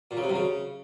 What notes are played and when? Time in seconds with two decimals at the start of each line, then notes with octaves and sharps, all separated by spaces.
0.11 A#2
0.17 C#3
0.23 C3
0.29 F#2
0.35 C#3